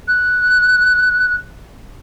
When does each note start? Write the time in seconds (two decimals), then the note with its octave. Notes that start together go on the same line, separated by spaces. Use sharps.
0.08 F#6